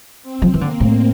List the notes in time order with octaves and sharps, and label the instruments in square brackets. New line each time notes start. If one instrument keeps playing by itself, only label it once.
[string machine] C4
[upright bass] F3
E3
[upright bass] D3 [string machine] A#3
[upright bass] A2